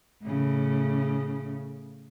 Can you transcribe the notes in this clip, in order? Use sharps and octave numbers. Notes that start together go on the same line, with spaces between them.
A2 C#3